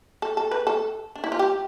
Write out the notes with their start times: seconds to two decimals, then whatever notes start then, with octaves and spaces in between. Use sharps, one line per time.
0.22 A4
0.37 A4
0.51 B4
0.67 A4
1.15 D4
1.24 E4
1.32 F4
1.39 G4